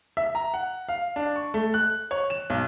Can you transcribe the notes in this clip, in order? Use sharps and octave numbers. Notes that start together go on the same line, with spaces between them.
E5
A#5
F#5
F5
D4
C#6
A3
F#6
C#5
E7
B1